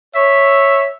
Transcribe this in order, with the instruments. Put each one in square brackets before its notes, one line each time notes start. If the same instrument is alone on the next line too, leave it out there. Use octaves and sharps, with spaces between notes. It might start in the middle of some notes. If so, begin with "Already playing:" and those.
[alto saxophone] C#5 [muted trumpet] E5